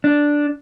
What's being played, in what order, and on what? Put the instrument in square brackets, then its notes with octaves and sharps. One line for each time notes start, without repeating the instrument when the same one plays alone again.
[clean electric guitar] D4